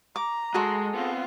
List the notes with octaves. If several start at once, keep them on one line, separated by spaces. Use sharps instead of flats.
A#5 D6
G#3 F#4 G#4 A4 C6
B3 C4 F4